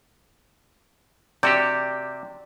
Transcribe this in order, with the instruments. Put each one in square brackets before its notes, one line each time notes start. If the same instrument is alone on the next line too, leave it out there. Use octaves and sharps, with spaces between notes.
[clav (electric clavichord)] C3 F#4 G4 [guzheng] D5 [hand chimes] G6